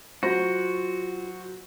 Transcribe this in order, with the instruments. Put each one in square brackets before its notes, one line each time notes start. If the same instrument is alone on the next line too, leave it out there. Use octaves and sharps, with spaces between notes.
[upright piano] F#3 C5 A#6 [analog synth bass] F4 [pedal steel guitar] F#4